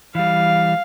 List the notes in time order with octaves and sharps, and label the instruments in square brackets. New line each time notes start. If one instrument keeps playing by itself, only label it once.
[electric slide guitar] E3 G3 [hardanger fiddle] F5